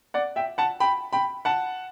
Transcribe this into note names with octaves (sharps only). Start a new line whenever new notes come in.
D5 F#5
E5 G5
F#5 A5
G5 B5
G5 B5
F#5 A5